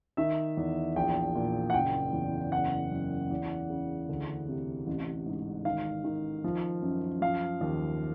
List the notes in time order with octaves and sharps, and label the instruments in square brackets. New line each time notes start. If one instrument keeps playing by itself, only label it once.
[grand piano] D#3 E5
E2
A#1 G5
A#2
F#5
F#1 G5
E2
F#1 F#5
F#2
E2
C#3
D2
C3
A1
G#2
D#3 F5
D#3
F3
F#2
F3 F5
D#2